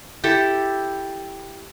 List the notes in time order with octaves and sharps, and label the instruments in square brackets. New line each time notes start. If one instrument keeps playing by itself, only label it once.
[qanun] E4 G4 A4 G5